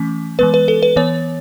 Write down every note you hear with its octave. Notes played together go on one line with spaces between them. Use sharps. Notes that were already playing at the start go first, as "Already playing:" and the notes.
Already playing: E3 A3 C#4
E3 G#3 B3 B4
B4
A4
B4
E3 B3 C#5